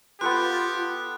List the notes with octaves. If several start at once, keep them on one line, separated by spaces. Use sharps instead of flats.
B3 F4 G4 A4 C5 F#6